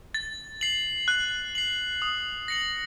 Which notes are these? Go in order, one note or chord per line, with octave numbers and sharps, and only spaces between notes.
A6
C7 F#7
F#6
C7 F#7
D#6
A#6 C#7 F#7